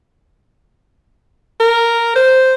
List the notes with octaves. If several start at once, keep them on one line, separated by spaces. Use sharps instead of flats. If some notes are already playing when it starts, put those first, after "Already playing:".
A#4
C5